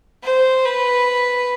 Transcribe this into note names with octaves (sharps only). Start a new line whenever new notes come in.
C5
B4